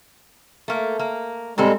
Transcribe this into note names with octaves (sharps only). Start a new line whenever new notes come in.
A3 A#3
A#3
A#2 G3 G#3 C4 A4